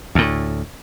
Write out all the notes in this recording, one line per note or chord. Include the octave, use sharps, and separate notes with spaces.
D2 A2